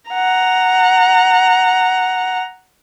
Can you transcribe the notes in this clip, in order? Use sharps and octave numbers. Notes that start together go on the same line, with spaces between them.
F#5 A#5